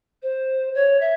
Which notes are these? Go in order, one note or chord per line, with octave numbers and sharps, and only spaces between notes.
C5
C#5
E5